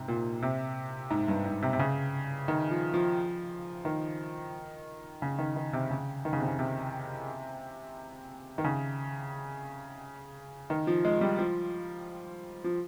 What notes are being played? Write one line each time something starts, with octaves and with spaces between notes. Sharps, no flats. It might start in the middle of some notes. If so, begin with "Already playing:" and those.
Already playing: G#2 C3
A#2
C3
G#2
G2
G#2
C3
C3
C#3
D#3
F3
F3
D#3
C#3
D#3
D#3
C3
C#3
D#3
C#3
C3
C#3
C3
D#3
C#3
D#3
F3
G#3
G3
F3
F3